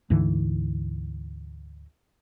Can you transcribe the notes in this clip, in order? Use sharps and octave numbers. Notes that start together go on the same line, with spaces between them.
D2 G#2 D3 E3